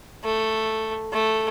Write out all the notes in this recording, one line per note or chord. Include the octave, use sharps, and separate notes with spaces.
A3
A3